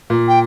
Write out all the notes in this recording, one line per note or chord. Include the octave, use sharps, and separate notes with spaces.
A#2
G5